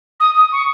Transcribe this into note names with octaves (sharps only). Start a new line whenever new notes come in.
D#6
D#6
C#6